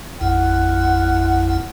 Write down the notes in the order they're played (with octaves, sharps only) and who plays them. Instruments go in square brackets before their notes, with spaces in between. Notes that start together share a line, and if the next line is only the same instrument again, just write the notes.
[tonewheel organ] A1 F2 E4 [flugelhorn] F#5